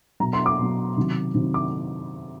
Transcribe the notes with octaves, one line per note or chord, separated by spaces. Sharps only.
B2 F#3 A#5
C6
D6
B2 F#3
C3 D#3 F#3
C3 D#3 F#3
D6